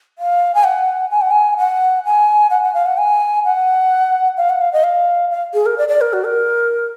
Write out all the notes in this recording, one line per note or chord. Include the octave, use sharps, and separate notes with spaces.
F5
G#5
F#5
G#5
F#5
G#5
F#5
G#5
F#5
F#5
F5
F#5
G#5
F#5
F5
F#5
F5
D#5
F5
F5
G#4
A#4
D5
D5
A#4
F#4
A#4